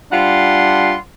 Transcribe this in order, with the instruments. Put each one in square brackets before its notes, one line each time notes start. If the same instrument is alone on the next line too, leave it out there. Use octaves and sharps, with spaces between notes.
[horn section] G3 D4 F4 F#5 C6